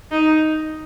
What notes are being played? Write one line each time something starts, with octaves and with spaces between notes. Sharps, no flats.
D#4